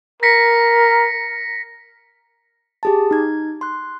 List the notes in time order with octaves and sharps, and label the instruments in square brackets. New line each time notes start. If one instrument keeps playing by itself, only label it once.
[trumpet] A#4 [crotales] A#6 B6 C#7
[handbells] G4 G#4 A5
D#4 G#6
C6 F#6